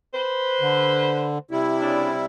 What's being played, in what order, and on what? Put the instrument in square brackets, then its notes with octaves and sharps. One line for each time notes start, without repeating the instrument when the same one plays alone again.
[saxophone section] B4 C5
[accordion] D3
C3 G3 E4
[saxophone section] C#3 D4